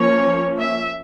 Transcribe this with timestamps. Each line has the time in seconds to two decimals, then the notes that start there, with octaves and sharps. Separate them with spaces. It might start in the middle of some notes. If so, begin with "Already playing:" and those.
Already playing: F3 A#3 C#4 C#5
0.59 E5